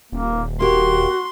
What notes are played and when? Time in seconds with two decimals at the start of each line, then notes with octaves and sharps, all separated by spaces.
0.12 D#1 A#3
0.60 A#3 F#4 G4 C6